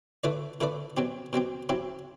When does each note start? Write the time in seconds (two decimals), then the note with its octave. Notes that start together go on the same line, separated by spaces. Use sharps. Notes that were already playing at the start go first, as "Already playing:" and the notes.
0.24 D3 A3 E4 B4 D5
0.61 D3 A3 E4 B4 D5
0.97 B2 F#3 C4 G4
1.33 B2 F#3 C4 G4
1.69 F#3 C4 E4 G4